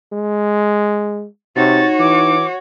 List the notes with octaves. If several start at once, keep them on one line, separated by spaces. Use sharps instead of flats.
G#3
C3 D#4 F#4 C#5 A6
E3 D6